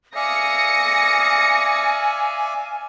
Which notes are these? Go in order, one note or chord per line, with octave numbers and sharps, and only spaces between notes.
D5 E5 F5 G#5 D#6 A#6 C#7